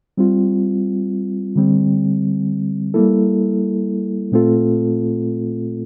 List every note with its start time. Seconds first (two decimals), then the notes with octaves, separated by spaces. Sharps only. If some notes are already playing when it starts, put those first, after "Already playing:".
0.17 G3 C4 F4
1.56 D3 G3 C4
2.94 G3 A#3 E4 A4
4.32 A#2 A3 C4 F4 A4